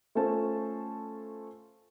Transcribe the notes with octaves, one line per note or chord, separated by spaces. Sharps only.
A3 C#4 F4 A4 C5 A5